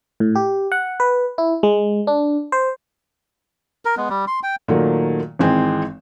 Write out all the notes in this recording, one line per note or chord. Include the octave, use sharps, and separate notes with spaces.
A2
G4
F#5
B4
E4
G#3
D4
C5
A#4
G#3 B3
G3
C6
G5
A#2 D#3 F#3 A3 A#3
G#1 E3 G#3 C4 G5 G#5